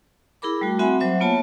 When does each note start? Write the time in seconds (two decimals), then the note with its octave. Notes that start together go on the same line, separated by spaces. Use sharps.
0.42 E4 G#4 A#4 B5 D6
0.61 G3 A3 F#4
0.79 C4 F#4 E5 F#5 G#5 B5
1.00 F#3 C5 E5
1.20 A#3 B3 F4 C#5 A5